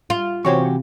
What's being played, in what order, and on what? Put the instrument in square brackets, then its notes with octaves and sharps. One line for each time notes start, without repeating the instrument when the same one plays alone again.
[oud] F4
[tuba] C3 [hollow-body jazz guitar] E3 F#4 G4 [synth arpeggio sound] C5 C#5 C#6